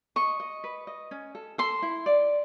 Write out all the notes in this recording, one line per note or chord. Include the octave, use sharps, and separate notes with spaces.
D#5 C#6
D#5
B4
D#5
C#4
A4
A4 C6
E4
D5